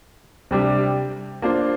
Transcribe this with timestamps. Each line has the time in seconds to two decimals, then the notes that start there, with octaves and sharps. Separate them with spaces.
0.51 C3 G3 D4 G4
1.42 A#3 D4 F4 C5